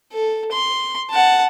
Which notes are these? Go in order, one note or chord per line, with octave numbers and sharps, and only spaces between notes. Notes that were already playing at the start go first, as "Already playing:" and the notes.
A4
C6
F#5 A5